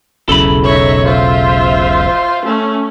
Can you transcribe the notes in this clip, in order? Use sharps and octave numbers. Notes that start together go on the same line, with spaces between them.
E1 B1 C#3 E4 A4 B5
D#4 C#5 E5
F4 C5 E5
A3 C#4